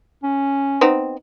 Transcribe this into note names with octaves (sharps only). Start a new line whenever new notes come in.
C#4
B3 C4 D#4